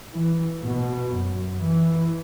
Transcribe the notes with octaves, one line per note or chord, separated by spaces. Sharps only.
E3
B2
F#2
E3